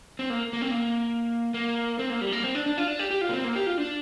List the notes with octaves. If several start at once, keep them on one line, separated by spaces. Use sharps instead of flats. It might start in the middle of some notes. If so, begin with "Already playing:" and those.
C4
A#3
A#3
C4
A#3
A#3
C4
A#3
G3
A#3
C4
D4
D4
F4
D4
G4
G4
F4
A#3
C4
A#3
G4
F4
D4